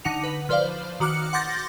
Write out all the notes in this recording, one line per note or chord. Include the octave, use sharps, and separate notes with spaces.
D3 D#4 F#5 C#7 F7
B4
F3 B4 C5 D5 F5
D#3 F#4 D6 F6 F#6 C#7
F#5 C6 D6 G6 A6 A#6